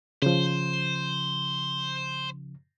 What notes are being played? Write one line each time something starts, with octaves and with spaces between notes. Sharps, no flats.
C#3 F3 C5